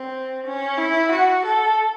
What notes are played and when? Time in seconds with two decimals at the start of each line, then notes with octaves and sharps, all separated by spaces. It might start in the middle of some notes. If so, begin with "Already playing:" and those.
Already playing: C4
0.46 C#4
0.78 E4
1.11 F#4
1.45 A4